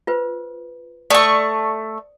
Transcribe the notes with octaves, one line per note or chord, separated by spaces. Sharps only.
F4 B4 C5
A3 C5 D5 C#6 D#6